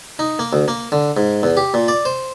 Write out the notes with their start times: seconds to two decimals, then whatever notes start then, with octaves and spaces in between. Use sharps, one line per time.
0.19 D#4
0.39 A#3
0.53 D2
0.68 A#3
0.92 D3
1.17 G#2
1.43 E2
1.57 G4
1.74 A#2
1.88 D5
2.05 C5